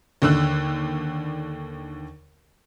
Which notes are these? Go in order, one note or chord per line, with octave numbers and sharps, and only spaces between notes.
D#2 D3 E6 F#6